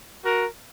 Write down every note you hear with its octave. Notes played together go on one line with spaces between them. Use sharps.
F#4 A#4